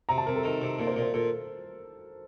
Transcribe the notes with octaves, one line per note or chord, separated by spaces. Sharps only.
C3 A#5
A5
C3 A#4
A4
D#3 A#4
C3
A#2 A4
C5
A#4
A#2
C5
A#2 A4